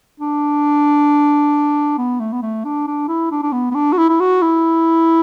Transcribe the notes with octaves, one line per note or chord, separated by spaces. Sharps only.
D4
B3
A3
B3
A3
D4
D4
E4
D4
D4
B3
B3
D4
F#4
E4
E4
F#4
E4